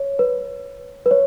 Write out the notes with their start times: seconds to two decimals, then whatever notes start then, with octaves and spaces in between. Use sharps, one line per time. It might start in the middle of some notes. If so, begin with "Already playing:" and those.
Already playing: C#5
0.19 B4
1.06 B4
1.11 C#5